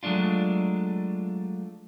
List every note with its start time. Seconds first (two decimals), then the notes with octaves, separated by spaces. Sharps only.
0.03 F#3 G#3 A3 D4 F4